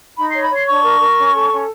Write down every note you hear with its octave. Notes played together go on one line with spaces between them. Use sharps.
D#4 B5
C#5 C6
B5
C#5 C6
D4 C#6
A#4
A#4
C#4
A4
C#4